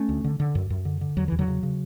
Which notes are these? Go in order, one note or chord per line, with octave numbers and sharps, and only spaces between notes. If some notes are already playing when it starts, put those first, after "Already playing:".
Already playing: A3 C#4
D2
D3
D3
F#2
F#2
D3
D3
E2 F#3
E2 E3
D3 F#3
C#3
C#3